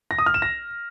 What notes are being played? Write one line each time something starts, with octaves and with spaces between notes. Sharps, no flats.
A#6
D#6
F6
E7
A#6